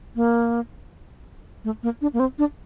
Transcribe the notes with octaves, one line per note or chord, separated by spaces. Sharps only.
A#3
A3
A#3
D4
A#3
C4
D4